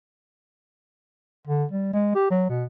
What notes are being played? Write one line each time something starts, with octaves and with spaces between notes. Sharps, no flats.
D3
G3
G#3
G4
F#3
B2